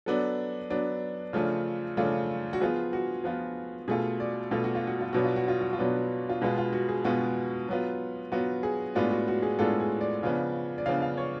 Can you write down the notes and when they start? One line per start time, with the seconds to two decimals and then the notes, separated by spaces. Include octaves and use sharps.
0.06 F#3 B3 D4 A4
0.70 F#3 B3 D4
1.33 C#3 F3 A3 D4 F4
1.97 C#3 F3 A3 D4 F4
2.53 F#4
2.61 F3 B3 F4 G#4
2.93 F#4
3.24 F3 B3 F4
3.88 B2 A3 F4 G#4
4.20 D5
4.51 B2 A3 F4
4.64 F#4
4.75 F4
4.87 F#4
5.01 F4
5.13 B2 F#3 B3 D4 F#4
5.24 F4
5.36 F#4
5.48 F4
5.61 F#4
5.73 F4
5.79 B2 F#3 B3 D4
6.29 F4
6.42 B2 G#3 B3 F4 F#4
6.58 F4
6.73 F#4
6.89 G#4
7.04 B2 G#3 B3 F4 F#4
7.68 F#3 B3 F4
8.32 F#3 B3 F4 F#4
8.63 G#4
8.95 A2 G#3 B3 D4 F4 F#4
9.12 F#4
9.28 F#4
9.42 G#4
9.59 A2 G#3 B3 D4 F4 A4
9.80 G#4
10.01 D5
10.23 C#3 F3 B3 D4
10.78 D5
10.86 C#3 F3 B3 D4 F5
11.02 F5
11.17 C#5